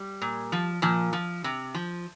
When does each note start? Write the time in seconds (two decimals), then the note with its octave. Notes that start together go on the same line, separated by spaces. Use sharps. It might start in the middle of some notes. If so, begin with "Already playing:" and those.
Already playing: G3
0.22 A#2
0.52 F3
0.82 A#2 F3
1.13 F3
1.44 C3
1.75 F3